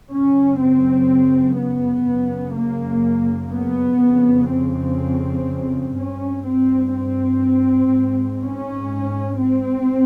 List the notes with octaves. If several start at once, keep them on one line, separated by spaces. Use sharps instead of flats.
F#2 C#3 C#4
C4
B3
F#2 C#3
A#3
B3
F2 C#3
C4
G2 C#4
C4
C4
G#2
C#4
C4